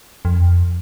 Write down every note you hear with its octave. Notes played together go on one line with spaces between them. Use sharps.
F2